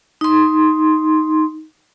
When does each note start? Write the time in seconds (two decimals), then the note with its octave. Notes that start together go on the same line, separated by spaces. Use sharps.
0.21 D#4 C6